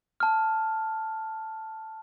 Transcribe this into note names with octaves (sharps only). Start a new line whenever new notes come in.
A5 F6